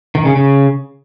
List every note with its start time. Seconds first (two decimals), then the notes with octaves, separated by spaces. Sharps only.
0.15 D#3
0.25 C#3
0.35 C#3